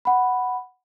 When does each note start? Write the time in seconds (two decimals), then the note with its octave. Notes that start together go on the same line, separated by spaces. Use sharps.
0.05 F#5 B5